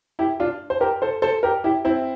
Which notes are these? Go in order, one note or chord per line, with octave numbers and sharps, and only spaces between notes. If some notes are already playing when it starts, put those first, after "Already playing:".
E4 G4
D4 F4
C5
G4 A#4
A4 C5
A4 C5
G4 A#4
E4 G4
C4 E4